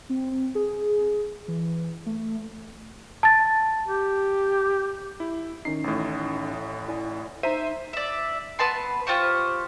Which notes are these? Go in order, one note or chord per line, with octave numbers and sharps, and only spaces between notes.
C4
G#4
E3
A3
A5 A6
G4
E4
D#3 C#4 D#4 C7
A1 A2
E4 D5 G#5
D#4 C5 E5 A#5 B6 D#7
D5 E5
B3 B4 A5 C6
F4 G4 C5 C#6